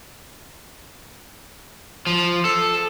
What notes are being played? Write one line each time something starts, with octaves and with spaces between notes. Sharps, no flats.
F3
A4